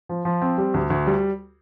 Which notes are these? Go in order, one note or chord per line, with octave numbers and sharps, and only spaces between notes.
F3
F3
C4
G3
D2
D2
G3